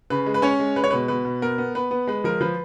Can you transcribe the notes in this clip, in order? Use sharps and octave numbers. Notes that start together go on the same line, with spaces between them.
C#3 B4
G#3
B4
C#4 C#5
G#3
G#3 B4
C#5
B2 B4
B2 B4
B2
B3 A#4
B3
B3 B4
B3
G#3 B4
F3 A#4
F3 B4